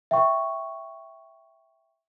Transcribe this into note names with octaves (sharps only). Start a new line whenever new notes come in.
E5 G5 C#6